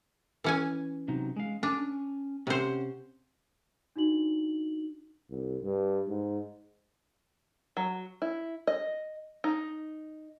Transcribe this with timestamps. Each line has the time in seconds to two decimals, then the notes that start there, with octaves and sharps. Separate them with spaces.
0.44 E3 C#4 G#5
1.08 C3 F#3 D#4
1.36 G#3 F5
1.63 C#4 D4 G#5
2.47 C3 C#4 C5 F#5
3.96 D4 D#4 F#4 F#7
5.31 C2
5.63 G2
6.09 G#2
7.77 F#3
8.22 E4
8.67 D#5
9.44 D#4